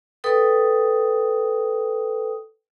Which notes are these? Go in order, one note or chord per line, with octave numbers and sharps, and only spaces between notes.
A4 B4 G5 D#6